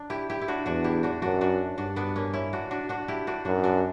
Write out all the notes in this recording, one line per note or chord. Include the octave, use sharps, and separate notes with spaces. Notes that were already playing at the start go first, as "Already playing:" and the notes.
Already playing: D4
E4 G4
E4 G4
E4
D4 F#4
E2 D4 F#4
E4 G4
D4 F#4
F#2 D4 F#4
D4 F#4
G2 D4 F#4
B3 D4
A#3 C#4
C#4 E4
D4 F#4
D4 F#4
D4 F#4
E4 G4
D4 F#4
F#2 D4 F#4
D4 F#4